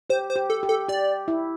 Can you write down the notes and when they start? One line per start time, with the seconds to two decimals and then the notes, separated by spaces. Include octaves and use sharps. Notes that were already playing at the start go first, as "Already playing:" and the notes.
0.10 G4 C5
0.30 C5
0.36 G4
0.50 A4
0.63 G4
0.69 A4
0.88 G4 D5
1.28 E4